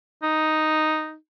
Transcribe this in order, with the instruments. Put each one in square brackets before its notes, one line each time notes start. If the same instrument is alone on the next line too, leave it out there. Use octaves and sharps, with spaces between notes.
[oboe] D#4